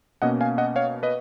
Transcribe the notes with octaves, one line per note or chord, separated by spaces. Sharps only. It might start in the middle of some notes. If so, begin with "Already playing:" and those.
B2 A#3 C#4 D#5 F#5
F5 G#5
D#5 F#5
C#5 F5
B4 D#5